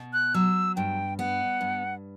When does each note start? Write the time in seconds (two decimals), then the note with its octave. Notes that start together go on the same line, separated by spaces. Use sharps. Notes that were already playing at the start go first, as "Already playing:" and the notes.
Already playing: B2
0.13 F#6
0.34 F#3 E6
0.76 G2 G5
1.19 B3 F#5
1.61 G2